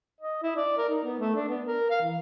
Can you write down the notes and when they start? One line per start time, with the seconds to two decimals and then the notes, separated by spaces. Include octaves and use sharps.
0.21 D#5
0.43 E4
0.56 D5
0.77 A#4
0.89 D#4
1.04 B3
1.20 A3
1.35 D4
1.48 B3
1.66 A#4
1.90 F5
2.02 E3